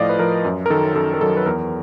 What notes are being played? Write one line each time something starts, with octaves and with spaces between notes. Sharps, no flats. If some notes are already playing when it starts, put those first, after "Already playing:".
Already playing: A2 F3 D5 D#5 F5
B4
F3 A#4
F#2
A#4
D#3 F#3 A4
F#2 A4
A#4
D#3 F#3 A4
B4
E2 A#4